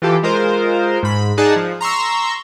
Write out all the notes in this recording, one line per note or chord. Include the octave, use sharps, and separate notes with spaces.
E3 F4 G4 A4
G#3 F4 A#4 C5
G#2 B5
D#4 G#4 D5 F#5 A5
F3
A#5 C6 C#6 E6